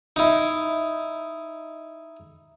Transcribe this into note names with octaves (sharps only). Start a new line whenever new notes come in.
D#4 E4